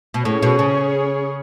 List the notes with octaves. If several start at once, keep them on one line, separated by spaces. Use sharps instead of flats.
B2
A2 C#4 G#4 C#5
B2
C#3